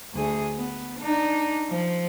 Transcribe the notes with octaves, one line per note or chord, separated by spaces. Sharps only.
D2 G#4
B3
D4 D#4
F3